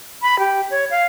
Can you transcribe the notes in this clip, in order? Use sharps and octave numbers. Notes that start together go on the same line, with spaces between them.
B5
G4
C#5
F5